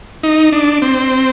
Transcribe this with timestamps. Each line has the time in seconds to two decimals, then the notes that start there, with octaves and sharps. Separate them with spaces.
0.23 D#4
0.52 D4
0.82 C4